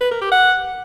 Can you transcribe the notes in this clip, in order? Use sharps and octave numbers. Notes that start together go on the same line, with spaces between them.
B4
A#4
G4
F#5